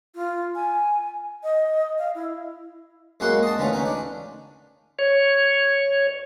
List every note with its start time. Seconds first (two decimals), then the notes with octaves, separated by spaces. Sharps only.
0.15 F4
0.55 G#5
1.43 D#5
1.98 F5
2.15 E4
3.20 F#2 G#3 A#3 F#4 F#5 C6
3.43 D#5 A5
3.58 D3 E3 A3 C#4 F4
3.73 C#4 D#4
3.86 D4
4.99 C#5